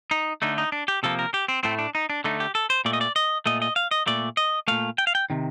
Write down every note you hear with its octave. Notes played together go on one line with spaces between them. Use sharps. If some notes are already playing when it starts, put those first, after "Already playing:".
D#4
D3 A3 D#4
D#4
D4
G4
C3 F3 A#3 A4
A#4
G4
C4
A2 A3 C4
D4
D#4
D4
D3 A3 D#4
G4
A4
C5
A#2 A3 D5
D#5
D5
D#5
A#2 A3 D#5
D#5
F5
D#5
A#2 A3 D5
D#5
A#2 A3 F5
G5
F5
G5
C3 D#3